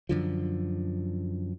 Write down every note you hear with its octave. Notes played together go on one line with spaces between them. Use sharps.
F#2 D3 F3